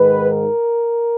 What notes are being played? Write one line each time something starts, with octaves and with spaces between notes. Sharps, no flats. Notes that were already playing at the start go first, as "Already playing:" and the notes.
Already playing: G#2 D#3 B4
A#4